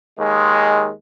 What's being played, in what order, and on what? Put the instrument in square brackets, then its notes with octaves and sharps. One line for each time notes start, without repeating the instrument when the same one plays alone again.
[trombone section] D#2 G#3